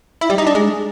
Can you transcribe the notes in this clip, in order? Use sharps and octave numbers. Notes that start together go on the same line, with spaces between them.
E4
G3
D#4
D4
G#3